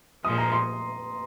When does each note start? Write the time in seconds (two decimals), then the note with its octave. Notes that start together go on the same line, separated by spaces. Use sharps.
0.24 A#2 F3 G#3 D#6
0.38 A#5
0.52 C6